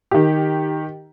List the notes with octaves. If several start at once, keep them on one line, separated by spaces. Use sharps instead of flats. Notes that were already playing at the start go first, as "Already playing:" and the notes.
D#3 G4